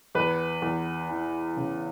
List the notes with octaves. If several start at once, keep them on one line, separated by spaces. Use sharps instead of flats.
E2 B4
E2
E3
C#3